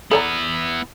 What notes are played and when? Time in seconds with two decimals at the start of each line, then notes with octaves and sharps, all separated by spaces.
0.11 B3 E4 A4 D5 A#5